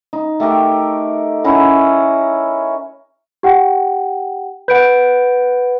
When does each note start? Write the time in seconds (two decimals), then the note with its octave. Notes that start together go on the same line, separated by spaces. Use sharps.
0.13 D#4
0.40 A3 G4 A#4 G5
1.44 C#4 E4 A#4 F#5
3.43 G4 F#5 G5
4.68 B4 F#5 G6 D7